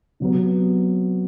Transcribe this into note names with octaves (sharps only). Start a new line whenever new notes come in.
C3 F#3 B3